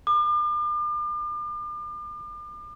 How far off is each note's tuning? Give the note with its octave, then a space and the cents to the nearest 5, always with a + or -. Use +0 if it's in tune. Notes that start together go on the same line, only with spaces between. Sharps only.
D6 +40